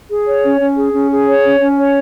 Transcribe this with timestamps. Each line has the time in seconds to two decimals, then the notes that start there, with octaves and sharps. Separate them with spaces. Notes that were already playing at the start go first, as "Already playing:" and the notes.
0.10 G#4
0.27 C#5
0.43 C#4
0.60 C#4
0.77 G#4
0.93 C#4
1.11 G#4
1.28 C#5
1.44 C#4
1.60 C#4
1.78 C#5